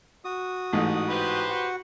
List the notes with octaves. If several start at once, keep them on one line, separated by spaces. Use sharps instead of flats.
F#4 D#6
A1 G#2 D#4
G4 B4 C5
F#4 F#5